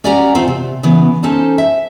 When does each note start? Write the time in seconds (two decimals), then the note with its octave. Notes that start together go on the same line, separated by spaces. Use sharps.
0.04 C#4 G4 D5 F#5 G#5 A#5
0.35 D#2 A3 C4 F4 C5
0.48 C3
0.83 C#3 E3 B3
1.23 C#4 D#4 A4 C5 A5
1.58 E5